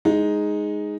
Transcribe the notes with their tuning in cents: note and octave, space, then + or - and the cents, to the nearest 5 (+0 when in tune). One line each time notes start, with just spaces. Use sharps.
G#3 +0 D#4 +0